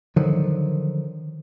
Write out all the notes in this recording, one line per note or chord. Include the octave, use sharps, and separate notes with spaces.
D3 D#3 F3 F#3